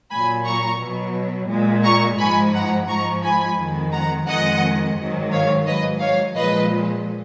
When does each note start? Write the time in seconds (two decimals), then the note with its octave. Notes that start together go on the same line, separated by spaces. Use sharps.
0.11 A#2 F#3 G#5 B5
0.45 A#5 C#6
0.80 B2 F#3
1.50 A#2 G#3
1.84 A#5 C#6
2.19 G#2 F3 G#3 G#5 B5
2.54 F#5 A#5
2.88 G#2 F3 G#3 A#5 C#6
3.23 G#5 B5
3.58 F2 D#3 G#3
3.93 F#5 A#5
4.28 F2 D#3 G#3 D#5 F#5
4.98 G#2 D#3 F#3
5.32 C#5 F5
5.66 G#2 F#3 B4 D#5
6.01 C#5 F5
6.36 A#2 F3 G#3 B4 D#5